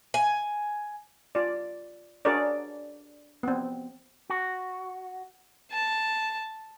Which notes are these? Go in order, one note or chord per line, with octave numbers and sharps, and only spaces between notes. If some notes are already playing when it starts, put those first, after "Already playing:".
G#5
F4 D5
D4 F#4 G#4 A#4 C#5 D5
B3 C4
F#4
A5